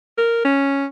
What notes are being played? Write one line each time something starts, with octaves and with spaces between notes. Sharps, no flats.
A#4
C#4